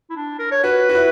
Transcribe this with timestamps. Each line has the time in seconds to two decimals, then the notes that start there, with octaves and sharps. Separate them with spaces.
0.10 E4
0.16 D4
0.39 A#4
0.51 C#5
0.64 F#4 B4
0.89 F#4
0.95 E4